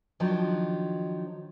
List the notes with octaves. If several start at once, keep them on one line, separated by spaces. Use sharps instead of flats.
D#3 F3 F#3 D4 D#4